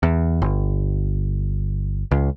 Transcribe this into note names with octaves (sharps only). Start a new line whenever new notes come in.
E2
G1
C#2